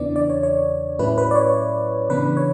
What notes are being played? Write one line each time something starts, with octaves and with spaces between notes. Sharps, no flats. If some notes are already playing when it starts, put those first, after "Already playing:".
Already playing: E2 C#3 E3 B3 D4 D5
D5
C#5
C#5
A2 F#3 C#4 E4 B4
B4
D5
C#5
C#3 E3 B3 D4 B4
C#5